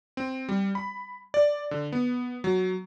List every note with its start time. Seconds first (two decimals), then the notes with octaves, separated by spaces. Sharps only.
0.17 C4
0.49 G3
0.75 B5
1.34 D5
1.71 D3
1.92 B3
2.44 F#3